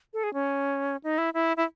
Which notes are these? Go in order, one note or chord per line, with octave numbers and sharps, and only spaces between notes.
A4
G#4
C#4
D#4
E4
E4
E4